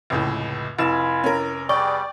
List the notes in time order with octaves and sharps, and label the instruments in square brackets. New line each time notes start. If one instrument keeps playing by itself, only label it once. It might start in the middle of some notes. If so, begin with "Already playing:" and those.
[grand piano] F1 C#2 A2
[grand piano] F1 E7 [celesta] E4 [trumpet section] F4 G#5 B5
[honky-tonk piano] C#4 A#4
[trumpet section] G3 B3 G#4 [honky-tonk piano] D5 G5 [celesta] C#6